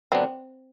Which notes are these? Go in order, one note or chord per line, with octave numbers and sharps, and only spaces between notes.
D3 F#3 B3 C4 D4